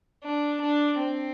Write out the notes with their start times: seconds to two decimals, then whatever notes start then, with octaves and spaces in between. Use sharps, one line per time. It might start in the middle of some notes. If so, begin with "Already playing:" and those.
0.24 D4
0.61 D4
0.99 C4